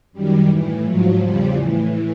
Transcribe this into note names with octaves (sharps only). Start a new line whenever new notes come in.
F#2 D#3 G3
A2 E3
G#2 F3 F#3
E2 C#3 F3 G3
A2 E3